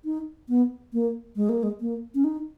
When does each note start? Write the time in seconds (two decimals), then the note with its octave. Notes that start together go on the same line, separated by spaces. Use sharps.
0.05 D#4
0.49 B3
0.93 A#3
1.36 G#3
1.49 A#3
1.63 G#3
1.81 A#3
2.15 C#4
2.24 D#4